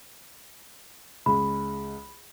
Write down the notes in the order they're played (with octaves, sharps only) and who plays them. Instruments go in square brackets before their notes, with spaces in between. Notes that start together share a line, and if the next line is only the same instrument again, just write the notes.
[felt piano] C#2 G#3 [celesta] B5